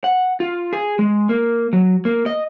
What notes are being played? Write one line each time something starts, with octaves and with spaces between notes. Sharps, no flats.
F#5
F4
G#4
G#3
A#3
F#3
A#3
D#5